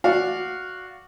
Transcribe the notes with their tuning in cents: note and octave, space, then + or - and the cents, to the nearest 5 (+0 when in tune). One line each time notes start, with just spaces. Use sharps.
F#4 -5 D5 +0 F5 +0